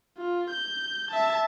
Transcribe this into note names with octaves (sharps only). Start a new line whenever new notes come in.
F4
G6
E5 A5